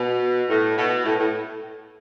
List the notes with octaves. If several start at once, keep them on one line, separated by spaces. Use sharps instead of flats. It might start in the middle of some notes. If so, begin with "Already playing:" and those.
Already playing: B2
A2
B2
A2
A2